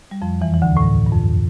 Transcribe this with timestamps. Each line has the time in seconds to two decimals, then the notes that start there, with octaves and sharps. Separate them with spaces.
0.11 G3
0.22 F2 F3
0.41 E2 E3
0.54 E3
0.62 D2 D3
0.77 A2
0.82 G2
1.06 G2
1.12 F2